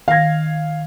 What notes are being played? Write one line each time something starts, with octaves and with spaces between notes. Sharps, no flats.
D#3 F5 G#6 A#6